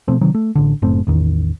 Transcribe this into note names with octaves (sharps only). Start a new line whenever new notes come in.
B2 F3 A3 C4
C3 D#3 F#3
A3
A1 D3
F#1 A2 A3 C4
A1 E2 D#3